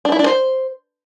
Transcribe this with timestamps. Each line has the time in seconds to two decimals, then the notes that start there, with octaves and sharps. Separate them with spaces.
0.05 D4
0.12 E4
0.19 D4
0.26 C5